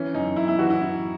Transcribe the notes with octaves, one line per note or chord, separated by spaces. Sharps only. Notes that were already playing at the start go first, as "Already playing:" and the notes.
Already playing: E3 C#4
F#2 D#4
F#2 E4
E4
E3 F#4
E4
E3